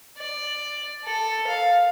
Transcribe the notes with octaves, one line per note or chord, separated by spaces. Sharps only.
D5
A4
F5